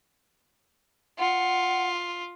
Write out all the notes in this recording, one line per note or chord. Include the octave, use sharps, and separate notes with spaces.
F4 F#5